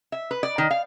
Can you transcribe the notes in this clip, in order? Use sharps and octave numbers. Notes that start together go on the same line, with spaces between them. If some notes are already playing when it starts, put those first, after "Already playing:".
E5
B4
D5
D#3
F5